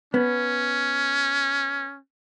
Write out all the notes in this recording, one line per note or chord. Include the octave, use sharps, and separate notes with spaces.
B3 C#4